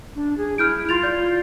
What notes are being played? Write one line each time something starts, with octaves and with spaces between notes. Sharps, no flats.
D4
G#4
E4 F6 G6 D7
F4 C6 A6 F7
D5 G6